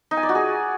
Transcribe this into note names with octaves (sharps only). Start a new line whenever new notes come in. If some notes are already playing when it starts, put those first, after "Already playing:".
D#4
G#5
D5
F#4
G#4